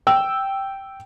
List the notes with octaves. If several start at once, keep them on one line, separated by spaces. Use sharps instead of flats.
G5 E6